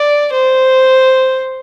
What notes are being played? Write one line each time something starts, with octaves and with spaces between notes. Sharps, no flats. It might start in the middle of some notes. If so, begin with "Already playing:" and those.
Already playing: D5
C5